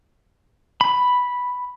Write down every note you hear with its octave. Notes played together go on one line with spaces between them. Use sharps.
B5